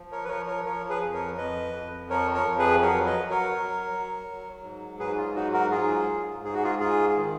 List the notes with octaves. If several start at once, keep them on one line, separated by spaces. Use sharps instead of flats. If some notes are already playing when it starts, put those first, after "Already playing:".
Already playing: F3
A#4 C#5
B4
F3 A#4 C#5
A#4 C#5
F3 A#4 C#5
G#4 B4
F2
A#4 C#5
F2 B4 D#5
F2
F3 A#4 C#5
A#4 C#5
F2
G#4 B4
F#3 A#4 C#5
B4 D#5
F#3
A#4 C#5
F#3
F#3
F#3
G#2
G#2 G#4 B4
F4
F#3 D#4 F#4
F#4 A#4
G#2 F4 G#4
G#2
G#2 G#4
F#4
F4 G#4
G#2 F4 G#4
D#3